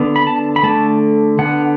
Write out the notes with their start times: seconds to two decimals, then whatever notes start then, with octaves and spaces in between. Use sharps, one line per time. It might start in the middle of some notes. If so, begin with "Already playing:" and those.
Already playing: D3 B3
0.16 B5
0.27 A5
0.56 B5
0.63 D3 A3 A5
1.39 D3 B3 F#5